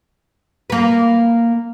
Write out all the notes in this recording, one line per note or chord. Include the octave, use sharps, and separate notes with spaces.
A#3 B4